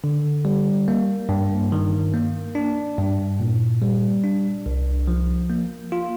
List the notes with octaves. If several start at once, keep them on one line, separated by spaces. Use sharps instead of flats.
D3
G3
A#3
G2
D#3
A#3
D4
G2
A#2
G3
D4
C2
F3
A#3
F4